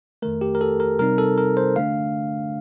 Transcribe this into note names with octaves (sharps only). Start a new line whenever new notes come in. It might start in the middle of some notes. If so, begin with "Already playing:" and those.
F2 D#3 A3 A#4
G4
A#4
A4
A#4
C3 G3 C4 D#4 A#4
A4
A#4
C5
D3 A3 D4 F5